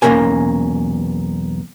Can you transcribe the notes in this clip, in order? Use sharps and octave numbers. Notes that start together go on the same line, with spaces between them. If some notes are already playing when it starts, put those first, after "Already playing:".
B1 E2 A#3 C#4 A#4 G#5